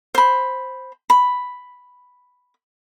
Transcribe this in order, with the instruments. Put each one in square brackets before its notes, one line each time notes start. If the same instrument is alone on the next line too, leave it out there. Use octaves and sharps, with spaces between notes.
[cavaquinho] C5 B5
B5